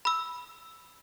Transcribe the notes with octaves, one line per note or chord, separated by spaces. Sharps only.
B5 E6